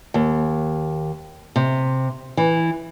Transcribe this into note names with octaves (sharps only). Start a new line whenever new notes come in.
D#2
C3
E3